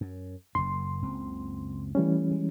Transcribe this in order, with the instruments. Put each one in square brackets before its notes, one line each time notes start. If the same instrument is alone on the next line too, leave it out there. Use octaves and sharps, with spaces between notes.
[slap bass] F#2
[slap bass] F#1 F#2 [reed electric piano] C6
[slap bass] F#1 C#2 C4
[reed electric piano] E3 G3 C#4 [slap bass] A3
[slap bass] G#3